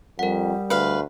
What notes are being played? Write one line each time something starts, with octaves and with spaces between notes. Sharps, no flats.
F2 G3 A#4 F#5
D2 B4 F5